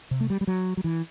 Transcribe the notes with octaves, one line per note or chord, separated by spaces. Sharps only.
C3
A3
G3
G3
F#3
F#3
E3